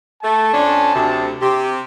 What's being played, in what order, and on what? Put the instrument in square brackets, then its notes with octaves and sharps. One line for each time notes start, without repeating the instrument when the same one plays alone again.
[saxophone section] A3 [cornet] A5
[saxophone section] F2 C#4 D4
D2 C3
C3 G4